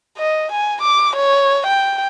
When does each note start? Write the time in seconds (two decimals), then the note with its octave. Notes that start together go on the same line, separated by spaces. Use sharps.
0.18 D#5
0.52 G#5
0.81 D6
1.16 C#5
1.66 G5